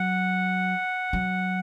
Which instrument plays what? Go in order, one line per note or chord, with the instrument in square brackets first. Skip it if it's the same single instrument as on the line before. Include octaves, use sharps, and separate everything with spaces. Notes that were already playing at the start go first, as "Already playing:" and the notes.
Already playing: [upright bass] F#3 [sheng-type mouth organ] F#5
[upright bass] F#3